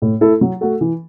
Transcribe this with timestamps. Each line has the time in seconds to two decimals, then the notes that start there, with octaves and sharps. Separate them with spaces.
0.02 A2
0.21 A3 E4 A4
0.41 F#3
0.61 A3 F#4 A4
0.81 E3